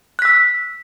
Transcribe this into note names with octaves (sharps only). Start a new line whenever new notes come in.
E6 F#6 B6